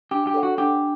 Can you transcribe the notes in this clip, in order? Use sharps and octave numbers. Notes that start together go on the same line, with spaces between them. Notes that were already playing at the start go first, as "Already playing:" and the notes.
D4 G4
G4
A4 C#5 F#5
F#4
D4 G4